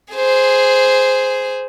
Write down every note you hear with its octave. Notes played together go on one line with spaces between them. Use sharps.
G#4 C5